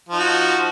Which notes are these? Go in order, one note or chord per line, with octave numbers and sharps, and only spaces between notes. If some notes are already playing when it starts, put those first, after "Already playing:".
F3 D#4 F#4